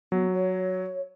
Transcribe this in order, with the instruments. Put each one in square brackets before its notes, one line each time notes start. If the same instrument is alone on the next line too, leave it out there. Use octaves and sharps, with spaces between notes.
[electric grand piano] F#3 [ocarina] B3
[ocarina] C#5